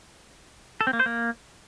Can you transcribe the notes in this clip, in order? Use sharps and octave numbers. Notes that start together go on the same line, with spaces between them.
A4
C4
A#3
C5
A#3